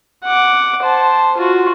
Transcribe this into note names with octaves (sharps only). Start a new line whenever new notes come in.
F#5 D6
C5 A5
F4 F#4